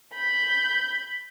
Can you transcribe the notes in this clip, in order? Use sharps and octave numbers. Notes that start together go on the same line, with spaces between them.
B5 G6